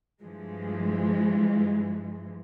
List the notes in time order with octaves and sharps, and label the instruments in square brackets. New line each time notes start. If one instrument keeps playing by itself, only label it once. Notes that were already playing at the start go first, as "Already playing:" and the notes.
[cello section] G2 E3 F3 G#3